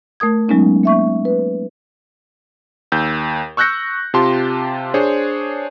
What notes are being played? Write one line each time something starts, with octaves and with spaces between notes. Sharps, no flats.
A3 A#4 D#6 G#6
F#3 G#3 B3 C#4 D#4
A#3 E5 C#6
B4
D#2 E6 G6
C#6 E6 F#6 G6 A#6 C#7
C3 F4 G4 A5 C6
D4 G#4 C5 C#5